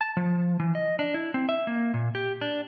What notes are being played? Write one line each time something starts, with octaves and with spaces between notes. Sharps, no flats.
A5
F3
E3
D#5
D4
E4
C4
E5
A#3
A#2
G4
D4